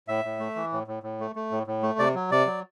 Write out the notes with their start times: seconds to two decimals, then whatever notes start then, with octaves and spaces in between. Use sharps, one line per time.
0.08 A2 E5
0.25 A2
0.40 A3
0.56 E3
0.73 A2
0.87 A2
1.03 A2
1.20 A3
1.36 A3
1.51 A2
1.67 A2
1.83 A3
1.99 C3 D5
2.14 F#3
2.31 C3 D5
2.46 F#3